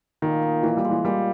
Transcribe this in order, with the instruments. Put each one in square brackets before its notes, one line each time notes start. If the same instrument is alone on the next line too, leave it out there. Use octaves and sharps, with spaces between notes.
[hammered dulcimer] A#2 [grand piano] D#3
[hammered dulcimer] D#4
[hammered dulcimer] A#2 [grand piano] E3
[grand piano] G3
[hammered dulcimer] G#3
[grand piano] E3
[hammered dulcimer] A#2 [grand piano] G3